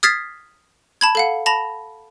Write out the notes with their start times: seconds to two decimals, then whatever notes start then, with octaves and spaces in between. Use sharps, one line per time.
0.03 D#6 F6 G#6 A6 B6 C7
1.01 A5 B5 G#6
1.15 A4 F5 F#5
1.46 A5 B5 A#6 F7